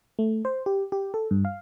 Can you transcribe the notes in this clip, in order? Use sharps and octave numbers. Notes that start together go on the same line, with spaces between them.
A3
C5
G4
G4
A4
G2
F5